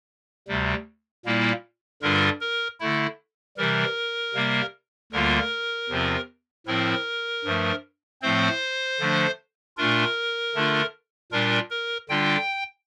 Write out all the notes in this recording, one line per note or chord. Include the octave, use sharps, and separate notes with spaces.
D2 C3 G3
A#2 G3 A#3 E4
G2 D3 G3 D4 F4 A#4
A#4
D3 A3 E4
C3 E3 G3 A#4
C3 G3 A#3
D2 D3 G3 A#3 F4 A#4
E2 C3 F3 C4 F4
A2 F3 C4 E4 A#4
G2 F3 A3
A2 F3 A3 C4 C5
D3 F3 A3 D4
A#2 A3 D4 F4 A#4
D3 A3 D4 F4
A#2 G3 D4 F4 A#4
A#4
D3 G3 D4 F4 G5